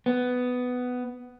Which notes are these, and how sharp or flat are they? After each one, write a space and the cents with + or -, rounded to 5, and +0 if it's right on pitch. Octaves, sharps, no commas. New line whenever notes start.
B3 +10